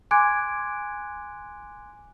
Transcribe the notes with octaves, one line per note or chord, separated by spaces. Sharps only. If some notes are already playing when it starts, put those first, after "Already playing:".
G#5 C6 D6 F#6 G#6 D7